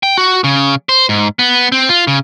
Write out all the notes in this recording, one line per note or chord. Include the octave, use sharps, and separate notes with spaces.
G5
F#4
C#3
C5
G#2
B3
C4
F4
C#3